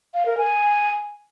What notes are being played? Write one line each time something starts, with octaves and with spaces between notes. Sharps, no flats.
F5
A#4
G#5